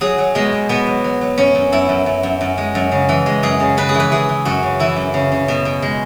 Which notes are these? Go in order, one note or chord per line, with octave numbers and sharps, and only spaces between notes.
F#3 G#4
F#3
B2 G#3
B2
B2 B3
F#3
F#3
F#3
F#2 C#4
F#2
F#2 E4
F#2
F#2
F#2
F#2
G#3
F#2
C#3
E3
G#3
F#2 G#4
C#3
C#3 B4
G#4
E3
B4
E3 G#4
E3
F#2 F#4
C#3
E3 E4
F#2
C#3
C#3
B2
B2
G#3